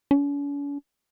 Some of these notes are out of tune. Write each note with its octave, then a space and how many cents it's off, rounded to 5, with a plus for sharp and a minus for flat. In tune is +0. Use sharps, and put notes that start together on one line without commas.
C#4 +45